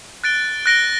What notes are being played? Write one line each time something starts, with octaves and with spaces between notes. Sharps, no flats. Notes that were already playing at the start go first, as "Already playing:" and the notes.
F#6 A6 D7 G7
F#6 A#6 D7 G7